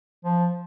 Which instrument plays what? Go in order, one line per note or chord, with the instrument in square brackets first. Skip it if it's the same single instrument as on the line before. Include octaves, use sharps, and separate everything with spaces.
[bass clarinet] F3